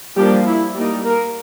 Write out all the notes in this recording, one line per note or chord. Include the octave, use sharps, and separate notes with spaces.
F3 G3 A#3 D4 G4
E4
G3 A#3 D#4
A#3 A#4